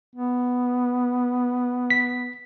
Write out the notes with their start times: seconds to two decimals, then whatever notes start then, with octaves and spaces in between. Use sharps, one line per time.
0.16 B3
1.90 B6